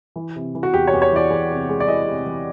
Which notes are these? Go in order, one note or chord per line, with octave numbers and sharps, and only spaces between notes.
E3
C3
E3
F#4
E2 G4
C#5
E2
C#5
E3 D5
E2
C3
G#3
D5
E3 D#5
C3
E3